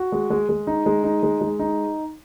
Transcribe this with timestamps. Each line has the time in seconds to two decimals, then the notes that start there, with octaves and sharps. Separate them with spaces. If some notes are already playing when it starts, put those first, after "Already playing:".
Already playing: F#4
0.12 G#3
0.30 G#3
0.49 G#3
0.67 D#4
0.86 G#3
1.04 D#4
1.23 G#3
1.41 G#3
1.59 D#4